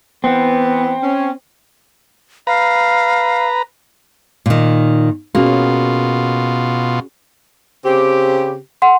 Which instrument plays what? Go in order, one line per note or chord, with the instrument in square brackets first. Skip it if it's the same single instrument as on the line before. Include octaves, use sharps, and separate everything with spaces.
[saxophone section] E3 B3 [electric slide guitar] C4
[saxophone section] C#4
[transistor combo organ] B4 A#5 [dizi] F5
[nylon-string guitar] A#2 D#3
[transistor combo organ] B2 F4 [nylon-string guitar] A#3 [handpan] C#4 F#4 G#4
[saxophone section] C#3 C4 G4
[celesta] F#5 C6